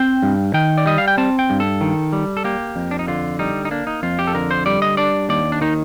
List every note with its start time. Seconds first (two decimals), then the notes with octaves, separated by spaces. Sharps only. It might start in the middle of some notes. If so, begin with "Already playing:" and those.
Already playing: C4 G5
0.23 G2
0.54 D#3 G5
0.78 D5
0.86 G3 D#5
0.98 F5
1.08 G5
1.18 C4 A5
1.39 G5
1.50 G2
1.60 A4
1.81 D#3
2.13 G3
2.37 A4
2.44 A#3 G4
2.76 F2
2.91 D4
2.99 D#4
3.08 D3 F4
3.39 G3 D#4
3.65 D#4
3.71 A#3 D4
3.87 D#4
4.03 F2 F4
4.19 G4
4.27 A4
4.34 D3 A#4
4.51 C5
4.66 G3 D5
4.82 D#5
4.97 D4 D5
5.29 D#2 D5
5.52 D4
5.61 D#3 D#4